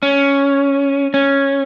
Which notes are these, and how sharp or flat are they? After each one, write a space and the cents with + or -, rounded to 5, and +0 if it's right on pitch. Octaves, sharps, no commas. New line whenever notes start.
C#4 +5
C#4 -5